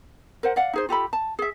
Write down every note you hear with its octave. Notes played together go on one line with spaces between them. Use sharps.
A#4 C5 F#5
D5 F5 F#5
D#4 G#4 C5
F4 G4 A4 B5
A5
G#4 E5